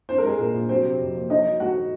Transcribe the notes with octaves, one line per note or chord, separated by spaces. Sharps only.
C4 C5
A#4
G#3 G#4
A#2 A#4
A#2
F#3 C4 C5
C3
F2
A#3
C#4 D#4 D#5
F#3
G#2 F#4 F#5